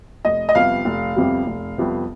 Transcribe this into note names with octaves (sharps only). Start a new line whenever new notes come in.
F1 D#5
D#5
F2 C3 G3 B3 F5
F1
F2 C3 G3 B3
F1
F2 C3 G3 B3